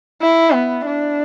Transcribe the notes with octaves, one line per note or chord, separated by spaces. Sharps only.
E4
B3
D4